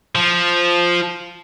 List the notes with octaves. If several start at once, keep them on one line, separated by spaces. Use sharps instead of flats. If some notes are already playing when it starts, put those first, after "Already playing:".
F3